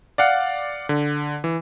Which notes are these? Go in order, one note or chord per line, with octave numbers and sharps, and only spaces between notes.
D5 F5 F#5
D3
E3